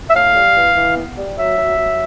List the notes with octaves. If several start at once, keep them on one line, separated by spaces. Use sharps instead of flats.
E5
A2 F5
G3
E3
E3
B3
G3
F#3 E5
F#3
F#3